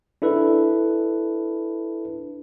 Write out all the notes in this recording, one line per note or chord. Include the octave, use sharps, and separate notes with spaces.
D4 E4 A4 B4